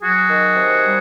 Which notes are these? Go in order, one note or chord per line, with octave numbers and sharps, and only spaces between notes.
F#3 F#4 G#4
D#3
C3
G3